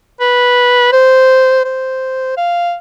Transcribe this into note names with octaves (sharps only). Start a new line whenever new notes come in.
B4
C5
C5
F5